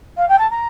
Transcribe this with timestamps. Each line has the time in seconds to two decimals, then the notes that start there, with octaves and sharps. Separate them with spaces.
0.17 F5
0.29 G5
0.39 A5
0.50 A#5